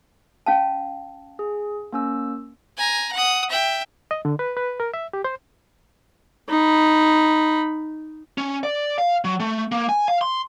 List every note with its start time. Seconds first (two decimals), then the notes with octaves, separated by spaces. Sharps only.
0.46 C#4 F5 A5
1.39 G#4
1.93 A#3 C#4 E6
2.77 G#5 A#5
3.12 F#5 D#6
3.50 E5 G5
4.11 D#5
4.25 D3
4.39 B4
4.57 B4
4.80 A#4
4.94 E5
5.13 G4
5.24 C5
6.49 D#4 B5
8.38 C#4
8.63 D5
8.98 F5
9.24 F#3
9.40 A3
9.72 A#3
9.89 G#5
10.08 F5
10.21 C6